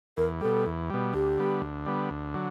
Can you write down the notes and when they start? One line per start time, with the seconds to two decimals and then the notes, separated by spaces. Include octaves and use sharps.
0.17 E2 A#4
0.41 B2 G3 A4
0.66 E2
0.90 B2 G3
1.14 D2 G4
1.38 D3 G3 B3
1.61 D2
1.86 D3 G3 B3
2.11 D2
2.34 D3 F#3